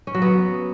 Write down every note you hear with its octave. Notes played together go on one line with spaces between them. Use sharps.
C#4
F#3
B3